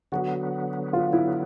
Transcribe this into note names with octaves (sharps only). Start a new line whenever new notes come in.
D3 F#3 B3 F#4
F4
E4